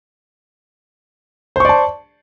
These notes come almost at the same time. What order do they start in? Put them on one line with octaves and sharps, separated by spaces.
C5 C#6 D5 A5